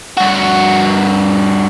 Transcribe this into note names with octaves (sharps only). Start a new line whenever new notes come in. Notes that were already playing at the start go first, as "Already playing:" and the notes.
G2 F#4